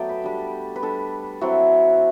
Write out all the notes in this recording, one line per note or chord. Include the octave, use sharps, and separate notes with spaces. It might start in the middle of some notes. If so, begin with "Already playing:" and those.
Already playing: F#3 A3 B3 D5 G5 A5
B4
G3 D4
B4
G3 D4 A4
F#3 C4 E4 F#4